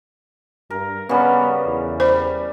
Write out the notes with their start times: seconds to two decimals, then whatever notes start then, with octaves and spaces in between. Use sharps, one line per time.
0.70 G2 A#4
1.09 C#3 G3 B3
1.66 E2
2.00 G3 C5